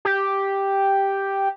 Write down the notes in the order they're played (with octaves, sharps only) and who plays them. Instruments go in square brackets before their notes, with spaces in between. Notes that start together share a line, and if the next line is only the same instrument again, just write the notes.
[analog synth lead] G4